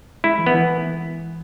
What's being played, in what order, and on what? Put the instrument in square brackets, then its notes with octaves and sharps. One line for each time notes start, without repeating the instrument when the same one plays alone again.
[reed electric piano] G#3 [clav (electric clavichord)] E4
[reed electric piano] E3
[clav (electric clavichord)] B3
[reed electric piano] E3